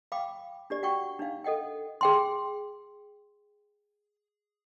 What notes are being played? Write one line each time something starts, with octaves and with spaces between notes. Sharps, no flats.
F5 G5 B5 D6
D4 G4 D5
F#4 F#5 G5 C#6
D4 D#4 F5
A4 D#5 F#5 G5
G#4 G5 C6